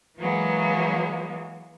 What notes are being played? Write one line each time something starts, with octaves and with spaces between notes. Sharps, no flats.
E3 F#3 G#3 A#3 B3